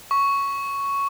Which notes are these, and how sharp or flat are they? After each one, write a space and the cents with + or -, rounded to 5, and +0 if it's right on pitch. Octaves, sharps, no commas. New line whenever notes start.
C#6 +5